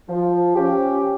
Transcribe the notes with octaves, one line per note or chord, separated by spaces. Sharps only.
F3
C#4 G4